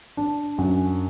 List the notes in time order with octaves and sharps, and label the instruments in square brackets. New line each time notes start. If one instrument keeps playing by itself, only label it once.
[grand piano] D4
F#2